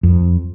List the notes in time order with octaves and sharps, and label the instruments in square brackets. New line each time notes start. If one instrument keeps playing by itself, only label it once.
[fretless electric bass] F2